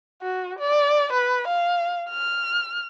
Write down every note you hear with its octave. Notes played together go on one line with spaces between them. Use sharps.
F#4
D5
B4
F5
F6